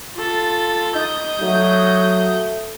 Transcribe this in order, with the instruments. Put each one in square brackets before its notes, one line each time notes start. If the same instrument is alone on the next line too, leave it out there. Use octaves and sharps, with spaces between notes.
[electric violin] F4 A4
[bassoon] D#4 [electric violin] D#6 G6
[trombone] F#3 [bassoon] A3